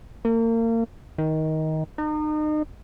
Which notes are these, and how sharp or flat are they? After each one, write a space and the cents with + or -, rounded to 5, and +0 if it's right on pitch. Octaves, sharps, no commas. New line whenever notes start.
A#3 -35
D#3 +15
D#4 -35